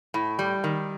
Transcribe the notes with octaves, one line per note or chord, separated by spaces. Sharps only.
A2
G3
D#3